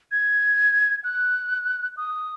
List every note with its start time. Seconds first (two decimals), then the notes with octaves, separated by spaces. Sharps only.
0.12 G#6
1.04 F#6
1.97 D#6